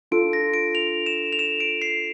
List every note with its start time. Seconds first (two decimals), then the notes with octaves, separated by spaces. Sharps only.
0.11 D4 F4 A4 D7
0.33 A#6
0.54 D7
0.75 F7
1.06 E7
1.33 F7
1.39 E7
1.60 D7
1.82 C7